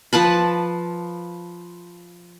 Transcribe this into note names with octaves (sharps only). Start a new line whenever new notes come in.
F3 B4 A5 B5